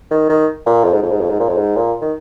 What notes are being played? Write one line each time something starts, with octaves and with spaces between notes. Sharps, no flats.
D#3
D#3
A#2
F2
G#2
F2
G#2
F2
G#2
A#2
F2
G#2
A#2
D#3